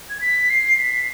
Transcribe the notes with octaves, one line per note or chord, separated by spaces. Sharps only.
G#6
B6
C7
B6